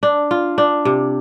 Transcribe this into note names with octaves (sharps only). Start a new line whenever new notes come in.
D4
F4
D4
C3